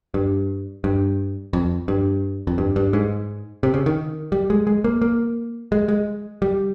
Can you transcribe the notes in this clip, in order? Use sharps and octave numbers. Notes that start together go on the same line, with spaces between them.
G2
G2
F2
G2
F2
G2
G2
G#2
C3
C#3
D#3
G3
G#3
G#3
A#3
A#3
G#3
G#3
G3